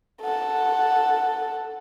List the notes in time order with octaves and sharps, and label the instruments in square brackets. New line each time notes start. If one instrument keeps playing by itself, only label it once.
[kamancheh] A4 F#5